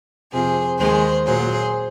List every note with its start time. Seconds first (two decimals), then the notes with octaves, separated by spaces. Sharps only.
0.33 F2 C3 F3 G#4 C5
0.79 D#2 D#3 G#3 G#4 C5
1.26 A#2 F#3 G#4 C5